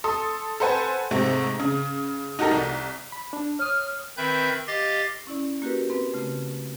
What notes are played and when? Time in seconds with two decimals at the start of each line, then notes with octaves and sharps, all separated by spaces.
0.04 A4 C6 D#6
0.60 A4 B4 C5 F#5 G#5
1.11 G#2 C3 A3 C4
1.60 C#3
2.39 D#4 F#4 G4 A4 A#4
2.51 C2
3.12 B5
3.33 D4
3.59 C#5 D#6 F6
4.17 D#3 C4 B4 E5 B5 G6
4.67 G4 D#5 F5 A6
5.27 C#4 E4 D5
5.62 A#3 F#4 G4 A#4 B4
5.90 B3 C4 B4
6.14 C#3 A3